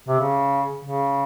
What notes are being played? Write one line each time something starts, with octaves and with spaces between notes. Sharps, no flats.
C3
C#3
C#3